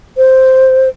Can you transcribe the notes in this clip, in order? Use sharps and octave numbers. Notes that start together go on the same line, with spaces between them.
C5